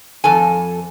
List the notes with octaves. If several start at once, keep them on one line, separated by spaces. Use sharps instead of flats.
F2 A4 G#5